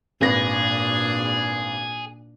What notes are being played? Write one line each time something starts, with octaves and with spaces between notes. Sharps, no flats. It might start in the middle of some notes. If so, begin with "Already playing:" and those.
G#1 A#2 D4 G#4 B4 A#6